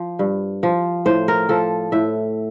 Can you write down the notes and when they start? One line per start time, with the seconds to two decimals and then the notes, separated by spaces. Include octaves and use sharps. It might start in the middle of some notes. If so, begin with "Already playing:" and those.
Already playing: F3
0.19 G2
0.63 F3
1.06 A2 C5
1.28 A#4
1.49 F3 A4
1.92 A2 E5